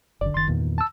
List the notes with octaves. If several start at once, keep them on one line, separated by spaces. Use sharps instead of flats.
F#1 D3 D5
F#1 D#3 C6 A6
E2 G2 A#2 D#3
A5 E6